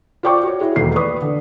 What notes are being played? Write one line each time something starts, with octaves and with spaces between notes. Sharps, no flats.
F4 C5 D5 G5 C#6 D6
F#4 C#5
E4 F#4 G#4
E1 D#2 B2 A3 A#3 C7
B4 D5 C#6 D#6
D3